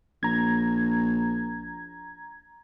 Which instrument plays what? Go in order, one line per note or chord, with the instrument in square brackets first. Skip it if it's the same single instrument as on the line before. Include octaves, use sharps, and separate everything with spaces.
[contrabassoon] A#1 [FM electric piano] A#5 G#6